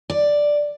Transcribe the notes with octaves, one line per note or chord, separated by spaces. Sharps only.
D5